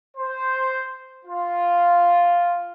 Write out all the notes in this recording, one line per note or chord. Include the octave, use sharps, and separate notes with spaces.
C5
F4